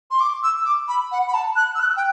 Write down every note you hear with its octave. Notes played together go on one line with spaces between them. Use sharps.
C6
D6
E6
D6
B5
F#5
B5
A5
F#6
E6
F#6
G5